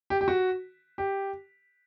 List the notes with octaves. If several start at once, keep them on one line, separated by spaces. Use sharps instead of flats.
G4
G4
F#4
G4